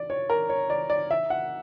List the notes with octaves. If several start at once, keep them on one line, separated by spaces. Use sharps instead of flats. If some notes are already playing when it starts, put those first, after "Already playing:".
Already playing: D5
C#5
A#4
C#5
D5
D5
E5
F#5